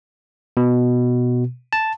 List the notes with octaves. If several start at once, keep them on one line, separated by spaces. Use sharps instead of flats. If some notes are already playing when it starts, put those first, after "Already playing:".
B2
A5